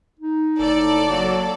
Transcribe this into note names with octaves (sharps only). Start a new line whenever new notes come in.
D#4
F#1 A2 A4 D5
F#3 A#3